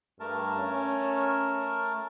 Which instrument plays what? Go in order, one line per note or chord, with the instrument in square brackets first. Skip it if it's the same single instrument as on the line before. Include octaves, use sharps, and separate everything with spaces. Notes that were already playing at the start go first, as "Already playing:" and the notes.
[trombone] G2 [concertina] A3 A#4 A5
[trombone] C#4